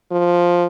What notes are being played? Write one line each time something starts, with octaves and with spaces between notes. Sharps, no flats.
F3